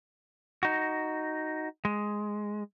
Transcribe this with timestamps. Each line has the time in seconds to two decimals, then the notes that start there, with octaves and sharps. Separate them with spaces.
0.63 D#4 F#4
1.85 G#3